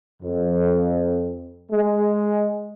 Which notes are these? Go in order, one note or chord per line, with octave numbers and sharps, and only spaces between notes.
F2
G#3